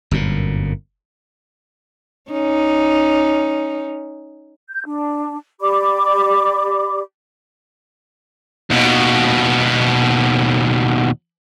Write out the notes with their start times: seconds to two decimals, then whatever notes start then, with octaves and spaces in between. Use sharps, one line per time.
0.11 G1 F#2 A#2
2.31 C#4 D#4
4.68 G6
4.85 D4
5.61 G4 D5 B5 D6
8.70 D#2 B2